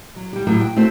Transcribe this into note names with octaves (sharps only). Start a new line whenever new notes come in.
F#3
G3 G4
A2 F#3 G3
G5
A3 C4 F#4 C5